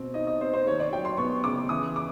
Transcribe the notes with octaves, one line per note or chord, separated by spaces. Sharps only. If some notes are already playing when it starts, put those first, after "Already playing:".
Already playing: B2 C4
D#4 D#5
D#5
C4 C5
C5
D#2 C#5
D5
F#3 G5
C6
B3 C#6
C#3 D6
E3 D#6
D6